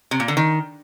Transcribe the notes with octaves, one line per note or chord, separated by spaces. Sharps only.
C3
A#2
D3
D#3